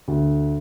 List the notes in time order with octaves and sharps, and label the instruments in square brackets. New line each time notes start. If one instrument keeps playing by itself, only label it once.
[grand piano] D2